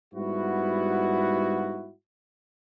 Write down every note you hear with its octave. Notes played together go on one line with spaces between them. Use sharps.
G#2 G3 B3 E4 F#4